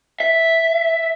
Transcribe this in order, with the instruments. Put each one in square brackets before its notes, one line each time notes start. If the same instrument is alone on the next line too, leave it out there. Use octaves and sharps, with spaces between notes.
[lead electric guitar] E5